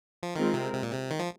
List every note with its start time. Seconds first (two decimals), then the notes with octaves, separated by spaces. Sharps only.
0.23 F3
0.35 D#3 G#3 C4 F4 A#4
0.54 C3
0.73 C3
0.83 A#2
0.92 C3
1.10 D#3
1.19 F3